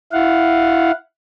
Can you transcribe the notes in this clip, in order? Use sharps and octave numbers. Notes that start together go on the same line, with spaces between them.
E4 F5 F#5